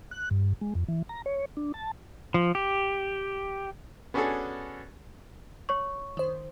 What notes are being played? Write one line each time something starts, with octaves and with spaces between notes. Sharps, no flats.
F#6
G2
G#3
F2
E3
A#5
C#5
D4
A5
F3
G4
B3 C#4 D4 F#4 G#4 A4
C#5 C#6
D#3 C5